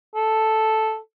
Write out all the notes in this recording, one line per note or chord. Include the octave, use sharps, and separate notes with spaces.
A4